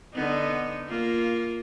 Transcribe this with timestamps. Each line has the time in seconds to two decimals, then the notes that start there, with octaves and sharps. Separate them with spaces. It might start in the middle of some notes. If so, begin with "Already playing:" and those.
0.13 D3 B3 D#4
0.88 A#3 F4